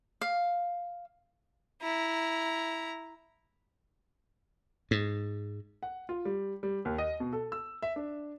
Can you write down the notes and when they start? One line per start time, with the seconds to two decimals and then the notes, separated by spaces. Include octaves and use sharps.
0.21 F5
1.82 E4 A#5
4.91 G#2
5.83 F#5
6.09 F4
6.25 G3
6.63 G3
6.85 D#2
6.98 D#5
7.20 B2
7.33 A4
7.52 E6
7.82 E5
7.96 D4